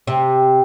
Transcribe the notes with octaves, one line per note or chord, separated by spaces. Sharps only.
C3